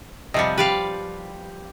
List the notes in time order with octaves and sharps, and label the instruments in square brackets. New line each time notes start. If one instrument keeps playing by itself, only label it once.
[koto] C3 F3 G3 [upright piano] D#5 C#7
[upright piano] G4 [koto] B4 D5 F5